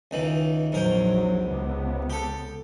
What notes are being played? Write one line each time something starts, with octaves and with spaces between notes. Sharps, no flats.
C#2 D#3 E3
A#1 E2 G#2 F#3 A#4 G5
C#2 C3 B3
G4 A4